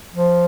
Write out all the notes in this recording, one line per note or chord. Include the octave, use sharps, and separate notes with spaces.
F3